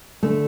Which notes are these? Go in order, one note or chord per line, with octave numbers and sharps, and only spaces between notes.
D3 A3